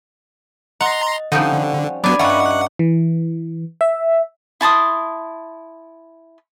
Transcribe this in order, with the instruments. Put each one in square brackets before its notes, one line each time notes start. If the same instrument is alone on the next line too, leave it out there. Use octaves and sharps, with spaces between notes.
[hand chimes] D#5 [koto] F#5 [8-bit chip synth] A#5 C6
[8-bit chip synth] D3 [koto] F3 C4 D#4 [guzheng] G3 C#4 [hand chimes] F#5
[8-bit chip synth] F#3 B3 [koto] D4 G#5 [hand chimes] B5 D6
[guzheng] G2 C#4 D#4 [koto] F4 [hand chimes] E5 C#6 D6 [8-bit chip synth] F#5
[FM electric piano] E3
E5
[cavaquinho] E4 A5 C6 D#6